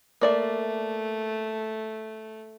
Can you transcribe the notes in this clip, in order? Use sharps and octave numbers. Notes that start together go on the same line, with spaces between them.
A3 A#3 D5 E5